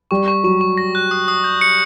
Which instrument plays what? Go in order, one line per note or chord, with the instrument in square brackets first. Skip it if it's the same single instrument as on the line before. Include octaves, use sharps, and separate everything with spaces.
[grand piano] G3 [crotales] C#6
[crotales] C#6
[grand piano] F#3 [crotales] C#6
[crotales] C#6
A#6
F#6
D#6
D#6
G6
C#7